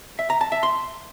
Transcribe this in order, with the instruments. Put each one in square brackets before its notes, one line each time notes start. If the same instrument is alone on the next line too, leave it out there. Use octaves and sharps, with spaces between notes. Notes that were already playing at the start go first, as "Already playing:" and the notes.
[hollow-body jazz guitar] E5
A#5
A5
E5
C6